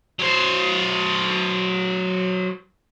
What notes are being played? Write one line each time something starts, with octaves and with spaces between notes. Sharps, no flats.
F#3 C5